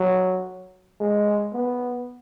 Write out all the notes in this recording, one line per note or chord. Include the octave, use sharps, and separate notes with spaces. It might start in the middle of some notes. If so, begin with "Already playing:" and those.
Already playing: F#3
G#3
B3